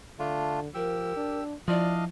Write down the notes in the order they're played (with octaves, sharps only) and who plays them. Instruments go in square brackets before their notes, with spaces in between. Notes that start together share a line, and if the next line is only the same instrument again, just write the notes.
[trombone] D3 [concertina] A3 D4 F4
[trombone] F3 [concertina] G4 E6 [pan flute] A#4
[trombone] D4
[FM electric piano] F3 [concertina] D4 D#5 F5 [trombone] E4 [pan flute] D5